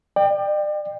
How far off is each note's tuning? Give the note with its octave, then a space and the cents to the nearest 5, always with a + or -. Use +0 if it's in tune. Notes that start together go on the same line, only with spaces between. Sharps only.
D5 +35 G5 +10